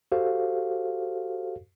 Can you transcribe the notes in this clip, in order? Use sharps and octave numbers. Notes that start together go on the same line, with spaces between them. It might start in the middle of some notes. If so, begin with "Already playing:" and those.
F#4 G4 A4 C5 F5